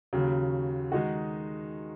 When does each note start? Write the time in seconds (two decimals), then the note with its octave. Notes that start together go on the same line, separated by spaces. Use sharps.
0.13 D#2 C#3 F#3
0.92 D#3 G#3 D#4 F#4